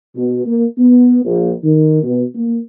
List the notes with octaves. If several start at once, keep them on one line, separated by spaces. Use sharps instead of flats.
B2
A#3
B3
A#1
D#3
B2
A#3